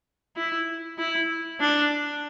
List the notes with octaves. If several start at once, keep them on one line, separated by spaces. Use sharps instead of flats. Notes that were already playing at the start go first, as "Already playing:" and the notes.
E4
E4
D4